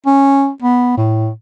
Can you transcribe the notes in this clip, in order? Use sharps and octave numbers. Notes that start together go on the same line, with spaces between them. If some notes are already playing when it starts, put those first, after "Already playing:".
C#4
B3
A2